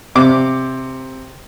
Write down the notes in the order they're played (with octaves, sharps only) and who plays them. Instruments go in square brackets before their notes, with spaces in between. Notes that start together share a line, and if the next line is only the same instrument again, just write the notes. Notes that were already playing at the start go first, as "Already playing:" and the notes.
[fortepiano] C3 D6